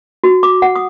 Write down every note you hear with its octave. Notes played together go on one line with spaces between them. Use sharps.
F#4
D6
F#5
D#6